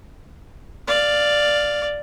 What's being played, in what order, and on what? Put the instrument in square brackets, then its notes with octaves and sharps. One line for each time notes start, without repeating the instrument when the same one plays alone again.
[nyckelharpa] D5 F5